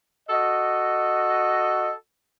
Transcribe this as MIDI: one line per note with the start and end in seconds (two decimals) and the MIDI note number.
0.29 1.92 66
0.29 1.92 69
0.29 1.92 75